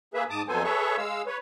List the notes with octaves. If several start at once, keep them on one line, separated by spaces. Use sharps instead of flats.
A#3 G#4 B4 E5
G#2 A5 D6 D#6
F2 F#3 B3 A4 C5 G#5
G#4 A4 B4 C#5 E5 C#6
G#3 F5 E6
B4 C#5